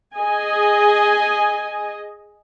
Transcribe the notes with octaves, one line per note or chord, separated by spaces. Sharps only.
G#4 D#5 G#5